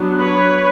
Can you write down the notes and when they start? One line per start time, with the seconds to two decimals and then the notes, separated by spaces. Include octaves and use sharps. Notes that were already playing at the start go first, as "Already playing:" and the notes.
Already playing: F#3 B3 D4
0.18 B4 C#5